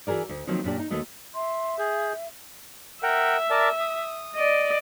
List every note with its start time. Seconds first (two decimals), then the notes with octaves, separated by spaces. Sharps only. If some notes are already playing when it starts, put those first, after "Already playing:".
0.07 E3 F#4 G#4 A#4 D5
0.29 D2
0.47 D#3 F3 F#3 A#3 C4
0.64 F#2 A#2 D4 G4
0.79 D#4
0.90 D#2 D#3 A3 F#4 D#5
1.34 E5 C6
1.79 G#4 G6
3.03 A#4 E5 F#5 G5
3.50 A#4 D5 A5
3.80 D#6
4.35 D5 D#5